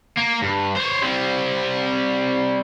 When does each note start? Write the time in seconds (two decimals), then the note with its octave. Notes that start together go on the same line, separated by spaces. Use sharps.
0.17 A#3
0.42 G2
0.76 C5 C#5
1.02 G3 C4